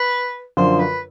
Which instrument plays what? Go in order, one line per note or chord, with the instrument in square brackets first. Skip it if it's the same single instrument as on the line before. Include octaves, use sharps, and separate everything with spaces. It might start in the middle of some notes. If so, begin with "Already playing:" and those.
Already playing: [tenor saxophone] B4
[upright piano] F#2 D3 F3 [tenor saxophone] C5
[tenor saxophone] B4